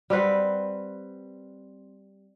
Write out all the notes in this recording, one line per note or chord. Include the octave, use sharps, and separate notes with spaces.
G3 C4 B4 F#5